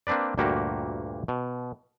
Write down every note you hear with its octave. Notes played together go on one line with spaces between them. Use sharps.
A#3 C4 D4 B4 D5
D2 G2 A#2 A#3 F#4 G4
B2